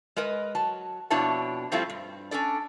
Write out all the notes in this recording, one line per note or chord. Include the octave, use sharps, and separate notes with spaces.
G#3 A#4 B4 D#5
F#3 A5
F2 B2 D4 E4 C#5 A5
F3 G3 A3 C4 E4 F4
G2
C#4 D4 A4 D5